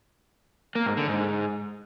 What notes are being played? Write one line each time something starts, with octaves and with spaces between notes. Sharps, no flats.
A#3
G#2
D3
G#2